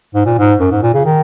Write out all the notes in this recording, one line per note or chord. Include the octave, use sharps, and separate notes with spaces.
G#2
A#2
G#2
F#2
G#2
A#2
C#3
D#3